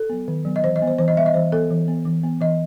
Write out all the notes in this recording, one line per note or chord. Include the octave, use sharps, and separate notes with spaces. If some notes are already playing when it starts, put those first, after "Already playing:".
Already playing: A4
F#3 B3
D#3
F#3 B3
D#5
E3 C5
D#5
G3 B3
C5
E3 C5
D#5
G3 B3 E5
D#5
E3 C5
B3 A4
E3
B3
E3
B3
E3 D#5